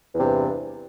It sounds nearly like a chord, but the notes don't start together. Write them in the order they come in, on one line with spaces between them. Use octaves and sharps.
E2 C3 G2